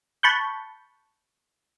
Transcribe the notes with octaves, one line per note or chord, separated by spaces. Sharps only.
A5 B5 C#6 F#6 G6